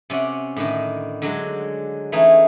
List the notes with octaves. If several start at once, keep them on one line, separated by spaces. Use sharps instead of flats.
C3 C#4 D5 F#5
A2 D3 D#3
D3 F#3 G#3
E3 A3 C#4 D#4 G#4